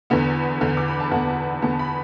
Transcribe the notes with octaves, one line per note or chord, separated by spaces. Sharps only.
E2 D3 B3
E2 D3 B3
D6
B5
A5
E2 D3 B3 F#5
E2 D3 B3 A5
B5